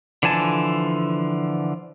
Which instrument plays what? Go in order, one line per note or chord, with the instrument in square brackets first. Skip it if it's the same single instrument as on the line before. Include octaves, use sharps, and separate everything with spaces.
[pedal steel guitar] D3 E3 F3 G#5 A5